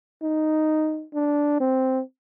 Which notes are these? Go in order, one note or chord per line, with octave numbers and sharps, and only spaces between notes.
D#4
D4
C4